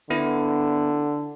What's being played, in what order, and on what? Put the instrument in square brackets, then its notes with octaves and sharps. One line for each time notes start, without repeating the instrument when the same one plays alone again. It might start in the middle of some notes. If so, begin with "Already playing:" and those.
[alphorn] D3 [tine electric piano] B3 E4